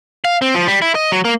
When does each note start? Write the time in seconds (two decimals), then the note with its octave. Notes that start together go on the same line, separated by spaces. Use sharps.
0.25 F5
0.42 C4
0.55 F3
0.67 G3
0.82 E4
0.95 D#5
1.12 F#3
1.25 A#3